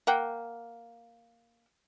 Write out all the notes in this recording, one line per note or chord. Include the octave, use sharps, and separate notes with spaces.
A#3 F#5 G5